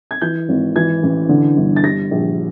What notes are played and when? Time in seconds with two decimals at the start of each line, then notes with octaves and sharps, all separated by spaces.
0.11 G#6
0.21 E3 G6
0.49 G#1
0.76 E3 G#6
1.03 A1
1.29 D3
1.57 G1
1.76 A6
1.84 G3 A#6
2.11 A#1